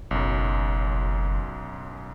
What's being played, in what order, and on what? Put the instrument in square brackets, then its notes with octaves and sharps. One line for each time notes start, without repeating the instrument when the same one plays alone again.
[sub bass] F#1 [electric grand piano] B1 F#2